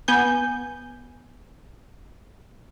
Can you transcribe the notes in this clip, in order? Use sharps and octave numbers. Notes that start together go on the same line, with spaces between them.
B3 G#5 G6